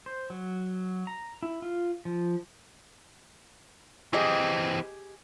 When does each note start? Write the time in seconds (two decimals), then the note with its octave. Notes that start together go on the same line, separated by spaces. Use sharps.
0.06 C5
0.30 F#3
1.07 A#5
1.43 E4
1.62 F4
2.05 F3
4.13 E3 C4 G4 G#4 D#5